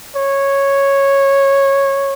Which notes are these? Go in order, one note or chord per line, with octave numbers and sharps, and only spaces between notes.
C#5